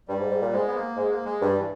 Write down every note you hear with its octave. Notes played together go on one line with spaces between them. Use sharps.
G2 G3
G#2
G#2
A#2
G#2 G#3
B3
A#3
G#2 G#3
A#3
G#3
G2 G3
E3